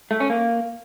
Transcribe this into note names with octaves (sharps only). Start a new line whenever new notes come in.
A3
C#4
A#3